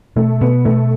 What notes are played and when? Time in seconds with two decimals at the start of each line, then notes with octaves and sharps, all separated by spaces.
0.16 B2 A3
0.41 B2 B3
0.65 B2 A3